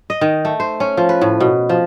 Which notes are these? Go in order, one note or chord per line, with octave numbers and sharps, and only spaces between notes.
D#5
D#3
A3
C5
C#4
F3
B4
A2
B2
F3